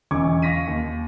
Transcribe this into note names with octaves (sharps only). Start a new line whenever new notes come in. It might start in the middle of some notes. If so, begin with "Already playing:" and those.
E1 C#4 C#6 D6 G#6
F5 C#6 A#6 B6 D#7
D#2